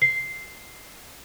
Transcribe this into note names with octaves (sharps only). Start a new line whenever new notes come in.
C7